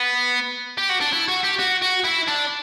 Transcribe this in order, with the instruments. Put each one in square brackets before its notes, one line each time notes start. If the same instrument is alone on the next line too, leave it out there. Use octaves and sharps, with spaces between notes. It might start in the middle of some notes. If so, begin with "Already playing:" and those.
Already playing: [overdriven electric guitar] B3
G4
F#4
D4
E4
F#4
G4
F#4
F#4
E4
D4